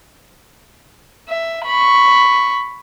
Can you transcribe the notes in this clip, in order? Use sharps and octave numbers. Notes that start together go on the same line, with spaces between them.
E5
B5 C#6